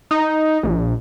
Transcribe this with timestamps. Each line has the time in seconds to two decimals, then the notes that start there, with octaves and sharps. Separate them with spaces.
0.11 D#4
0.63 A#1